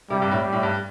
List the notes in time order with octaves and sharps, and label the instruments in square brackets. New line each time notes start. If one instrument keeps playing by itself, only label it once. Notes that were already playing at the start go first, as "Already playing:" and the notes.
[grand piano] C3 [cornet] G3
[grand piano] G2
A2
[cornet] G3
[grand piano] A2
G2